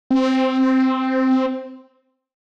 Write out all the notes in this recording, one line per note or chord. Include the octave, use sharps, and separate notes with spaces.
C4